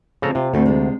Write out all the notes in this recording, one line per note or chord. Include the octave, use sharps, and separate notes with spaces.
C#3 F3 C4 A4 A#5
C3 F4
D2 A3 B3 C4
C3 G#3 D4